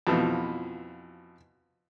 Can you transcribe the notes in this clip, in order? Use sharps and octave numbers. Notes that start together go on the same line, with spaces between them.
F2 B2 E3 F3